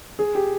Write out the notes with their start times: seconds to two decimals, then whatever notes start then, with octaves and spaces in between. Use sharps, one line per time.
0.19 G#4
0.35 G4